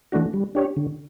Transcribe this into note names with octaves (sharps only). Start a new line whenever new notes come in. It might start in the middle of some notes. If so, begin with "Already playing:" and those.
E3 A3 D4 F#4
G3
D4 G4 C#5
D3